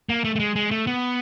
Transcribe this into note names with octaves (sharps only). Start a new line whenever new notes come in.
A#3
A3
A3
G#3
G#3
A3
B3